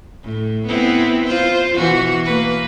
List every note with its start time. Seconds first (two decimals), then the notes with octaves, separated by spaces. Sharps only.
0.23 A2
0.67 B3 C4 E4
1.26 F4 C5
1.75 B2 E3 F#4
2.25 A#3 B4